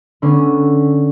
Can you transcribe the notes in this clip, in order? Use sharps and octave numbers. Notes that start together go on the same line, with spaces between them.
D3 B3 C#4 D4